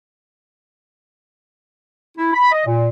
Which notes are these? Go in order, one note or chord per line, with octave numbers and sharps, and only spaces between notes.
E4
B5
D#5
A#2